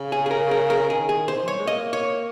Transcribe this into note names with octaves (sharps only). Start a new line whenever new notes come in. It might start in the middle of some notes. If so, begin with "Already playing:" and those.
Already playing: C#3
G#4
G#4
A#4
A#4
A#4
D#3 G#4
G#4
C5
D#3
F3
G3 C#5
G#3
A#3 D#5
C#5